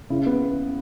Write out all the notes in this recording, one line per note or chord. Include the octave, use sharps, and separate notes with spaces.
C#3 E4
B3